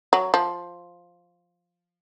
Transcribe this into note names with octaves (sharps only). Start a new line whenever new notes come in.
F#3
F3